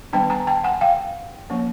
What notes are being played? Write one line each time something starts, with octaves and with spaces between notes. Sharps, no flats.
D#3 G3 B3 D4 G5 A5
G#5 A#5
G5 A5
F#5 G#5
F5 G5
F3 A#3 C#4